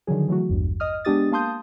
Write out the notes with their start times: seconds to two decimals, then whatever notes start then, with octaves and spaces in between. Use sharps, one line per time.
0.07 D3 D#3 F3 F#3 G#4
0.28 E3 F#3 A3 F#4
0.50 A1 E2 G2
0.80 D#5 D#6 F6
1.05 G#3 B3 D4 G4 D#6 A6
1.32 A#3 F5 A5 C6 D#6 G6